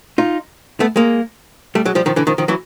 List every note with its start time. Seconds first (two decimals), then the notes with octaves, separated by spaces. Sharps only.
0.18 D#4 F4
0.80 A3 B3
0.96 G#3 A#3
1.75 G3 A3
1.85 F#3 G#3
1.95 F3 G3
2.06 D#3 F3
2.16 D3 E3
2.27 D#3 F3
2.38 D#3 F3
2.48 E3 F#3